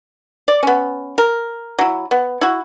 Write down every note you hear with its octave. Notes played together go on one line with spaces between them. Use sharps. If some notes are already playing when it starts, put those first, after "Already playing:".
D5
B3 C#4
A#4
F#3 E4
B3
E4 F#4